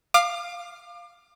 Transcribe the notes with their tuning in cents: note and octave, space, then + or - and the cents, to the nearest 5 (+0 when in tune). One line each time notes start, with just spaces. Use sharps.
F5 +0 D6 +35